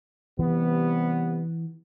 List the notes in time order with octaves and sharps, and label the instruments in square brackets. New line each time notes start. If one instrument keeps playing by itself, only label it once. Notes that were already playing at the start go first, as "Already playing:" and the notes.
[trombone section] C3 G3 B3 [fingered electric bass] E3